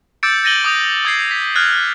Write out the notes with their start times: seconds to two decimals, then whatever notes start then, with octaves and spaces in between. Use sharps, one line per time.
0.23 D6 E6 G6 A6 C#7 D7
0.43 G6 A6 A#6 D#7 F#7 G7
0.64 D6 D#6 G6 F7
1.05 D#6 G#6 A6 C7
1.31 B6
1.55 F6 F#6 G#6 A6 C7